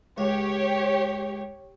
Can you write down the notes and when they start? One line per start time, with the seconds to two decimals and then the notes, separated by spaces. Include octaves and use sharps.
0.18 C#2 G4 C#5